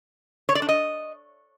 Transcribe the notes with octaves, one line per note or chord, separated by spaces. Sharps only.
C#5
D5
D4
D#5